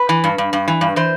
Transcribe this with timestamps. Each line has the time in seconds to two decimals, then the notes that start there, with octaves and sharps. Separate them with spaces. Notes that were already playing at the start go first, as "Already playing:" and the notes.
Already playing: B4
0.09 E3
0.24 G2
0.38 G2
0.53 G2
0.68 E3
0.81 G2
0.96 E3 C5